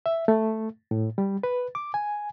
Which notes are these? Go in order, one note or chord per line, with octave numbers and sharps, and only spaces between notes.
E5
A3
A2
G3
B4
D6
G#5